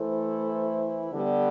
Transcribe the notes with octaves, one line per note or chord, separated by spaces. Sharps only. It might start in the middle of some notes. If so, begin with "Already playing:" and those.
Already playing: E3 A3 E4 A4 C5
D3 G3 B3